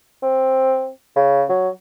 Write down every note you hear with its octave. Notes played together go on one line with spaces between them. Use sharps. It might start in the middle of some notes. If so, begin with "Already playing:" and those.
C4
C#3
F#3